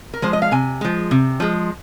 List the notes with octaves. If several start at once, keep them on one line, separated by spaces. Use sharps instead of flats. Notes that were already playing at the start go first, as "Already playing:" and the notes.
A#4
F3 G#3 C5
D#5
F5
C3 G#5
F3 G#3
C3
F3 G#3